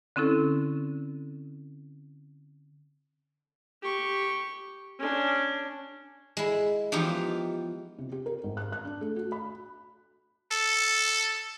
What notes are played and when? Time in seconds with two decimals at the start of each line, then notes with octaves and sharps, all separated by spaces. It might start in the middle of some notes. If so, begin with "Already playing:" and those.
0.16 D3 C4 C#4 E4 A4
3.82 G4 C#6
4.99 C#4 D4
6.37 G#3 E4
6.92 E3 F3 B3 D#4 F4 G4
7.99 C3
8.12 G4
8.26 A#4
8.44 G#1
8.57 F#6
8.72 F#6
8.85 D4
9.01 A3
9.16 F#4
9.32 B5
10.52 A4